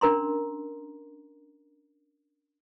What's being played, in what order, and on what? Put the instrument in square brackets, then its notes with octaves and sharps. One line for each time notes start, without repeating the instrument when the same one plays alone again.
[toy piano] C#4 D4 A#4 A#5 C6